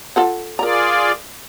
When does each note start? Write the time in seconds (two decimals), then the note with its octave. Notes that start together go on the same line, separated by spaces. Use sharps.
0.16 F4 A4 F#5
0.59 F4 G#4 A#4 D5 A#5